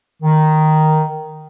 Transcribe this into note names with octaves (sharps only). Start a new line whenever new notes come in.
D#3